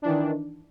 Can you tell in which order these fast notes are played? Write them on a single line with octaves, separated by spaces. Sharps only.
D4 E3 D#3